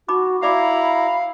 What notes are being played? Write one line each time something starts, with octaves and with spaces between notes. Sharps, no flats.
D#4 F#4 B5 D6
E4 F#4 D5 F5 A#5 B5 D6